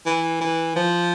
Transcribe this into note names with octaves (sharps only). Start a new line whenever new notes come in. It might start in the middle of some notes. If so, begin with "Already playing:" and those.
E3
E3
F3